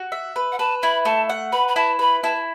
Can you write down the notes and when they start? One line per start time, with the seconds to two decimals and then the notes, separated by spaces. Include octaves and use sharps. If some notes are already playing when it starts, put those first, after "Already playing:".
Already playing: F#4
0.12 E5
0.36 B4
0.52 F#5
0.59 B4 A5
0.82 E4 B5
1.05 A3 A5
1.29 F#5
1.53 B4 B5
1.68 B5
1.76 E4 A5
1.99 B4 B5
2.23 E4 A5